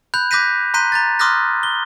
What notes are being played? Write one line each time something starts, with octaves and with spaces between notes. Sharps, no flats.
B5 F#6 G6 F7
D6 F#6 G6 A#6 B6 D#7
A#5 C6 F#6 G6 B6 D#7
A#5 F#6 A6
C6 D6 D#6 F6 F#6 A#6
G7